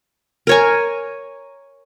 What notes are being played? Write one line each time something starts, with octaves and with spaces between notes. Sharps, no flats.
A#4 C#5 G#5